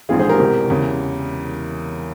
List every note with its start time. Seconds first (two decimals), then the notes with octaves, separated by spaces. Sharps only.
0.09 A#1 G#2 E3 F4 G#4
0.19 G#4 C5
0.29 G4 A#4
0.40 E1 E2 C3
0.70 E2 C#3 E3